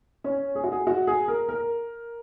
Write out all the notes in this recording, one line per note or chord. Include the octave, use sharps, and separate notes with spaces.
C#4
G#4
F#4
G#4
F#4
G#4
A#4
A#4